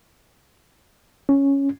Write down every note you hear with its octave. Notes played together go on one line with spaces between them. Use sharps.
C#4